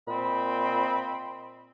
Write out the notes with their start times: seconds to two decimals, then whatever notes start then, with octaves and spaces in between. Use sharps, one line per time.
0.08 A#2 C4 D#5 B5